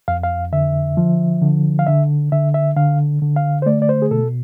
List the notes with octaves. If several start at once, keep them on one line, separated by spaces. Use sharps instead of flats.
F2 F5
F5
D3 E5
F3
D3
F5
D3 E5
D3 E5
E5
D3 F5
D3
F5
C5
A3 D5
D5
C5
G#4
B2 A4